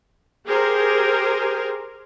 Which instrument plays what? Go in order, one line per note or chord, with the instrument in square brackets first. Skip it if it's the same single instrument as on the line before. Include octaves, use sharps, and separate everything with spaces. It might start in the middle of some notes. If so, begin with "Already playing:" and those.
[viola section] G4 G#4 A#4 C5